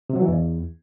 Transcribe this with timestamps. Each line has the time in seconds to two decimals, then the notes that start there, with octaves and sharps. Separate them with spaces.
0.10 C3
0.16 F#3
0.22 E3
0.28 E2